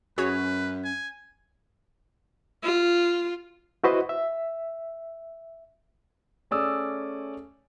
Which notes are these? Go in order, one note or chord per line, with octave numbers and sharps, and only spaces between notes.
F#2 C#4 F#4 G#4 B4 C#5
G#5
F4
E4 F#4 B4 C5 D#5
E5
A3 C#4 G#4 D5 D#6 E6